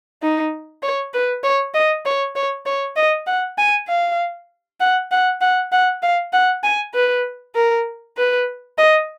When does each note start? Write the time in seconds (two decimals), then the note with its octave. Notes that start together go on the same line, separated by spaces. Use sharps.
0.22 D#4
0.82 C#5
1.13 B4
1.44 C#5
1.74 D#5
2.06 C#5
2.36 C#5
2.66 C#5
2.96 D#5
3.27 F#5
3.58 G#5
3.88 F5
4.80 F#5
5.11 F#5
5.41 F#5
5.72 F#5
6.02 F5
6.33 F#5
6.63 G#5
6.94 B4
7.55 A#4
8.17 B4
8.78 D#5